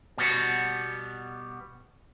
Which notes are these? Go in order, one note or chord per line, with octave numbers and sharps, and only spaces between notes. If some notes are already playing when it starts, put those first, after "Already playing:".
B2 G3 B3 F#4